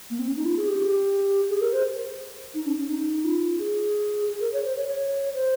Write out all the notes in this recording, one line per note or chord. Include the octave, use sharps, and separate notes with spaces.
A#3
C4
C#4
D#4
F4
G#4
G4
G#4
A#4
C5
D#4
C#4
C#4
D#4
F4
G#4
G#4
A#4
C#5
C5
C#5
C#5
C5